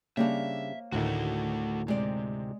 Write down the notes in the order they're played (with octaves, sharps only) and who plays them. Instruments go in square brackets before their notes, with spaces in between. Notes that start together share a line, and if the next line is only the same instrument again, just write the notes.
[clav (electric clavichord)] C#3 G3 D4 [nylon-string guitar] A#3 C5 C#5 [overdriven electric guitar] E5
[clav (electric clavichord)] D2 A2 D#3 [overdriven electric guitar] A3 F#4
[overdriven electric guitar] C3 [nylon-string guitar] G#3 D5